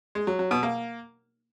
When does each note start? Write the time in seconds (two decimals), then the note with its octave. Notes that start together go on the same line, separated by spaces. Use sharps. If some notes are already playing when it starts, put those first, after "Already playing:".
0.15 G#3
0.27 F#3
0.39 F#3
0.51 B2
0.63 A#3